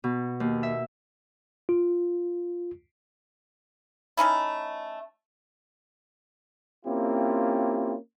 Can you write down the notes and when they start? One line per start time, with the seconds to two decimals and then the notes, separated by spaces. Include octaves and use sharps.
0.04 B2
0.40 D#2
0.63 E5
1.69 F4
4.17 A3 C#4 D#4 E4
6.86 A#3 C4 C#4 E4 F4 G4